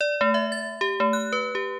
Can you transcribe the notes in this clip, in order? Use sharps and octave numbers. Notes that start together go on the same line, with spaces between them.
D5
A3
E5
A6
G4
A3
F#6
B4
G4